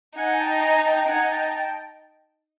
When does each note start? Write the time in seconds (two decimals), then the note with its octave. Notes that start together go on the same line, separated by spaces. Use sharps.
0.17 D#4 F#5 G#5
0.40 G5 A5
0.62 G#5 A#5
0.86 G5 A5
1.08 D#4 F#5 G#5
1.31 G5 A5
1.54 G5 A5